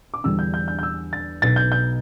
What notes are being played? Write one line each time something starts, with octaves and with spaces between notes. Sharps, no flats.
D6
E2 D3 G3 D4 E6
G6
G6
G6
G6
E6
A6
B1 B2 B3 A6
G6
G6